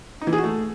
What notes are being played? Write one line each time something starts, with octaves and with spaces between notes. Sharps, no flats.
D#4
E3
G#4
F#4
A3